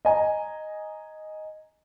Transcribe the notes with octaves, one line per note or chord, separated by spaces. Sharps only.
D#5 G#5 A#5